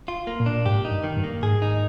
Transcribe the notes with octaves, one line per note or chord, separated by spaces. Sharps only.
F4
A#3
A#2
D4
G#2 G4
D#4
G2
D#3
G2
A#3
G#2 G#4
D#4